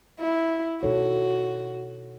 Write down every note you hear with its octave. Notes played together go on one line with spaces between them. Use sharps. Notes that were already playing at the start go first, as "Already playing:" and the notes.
E4
B2 A3 D#4 F#4 A4 C#5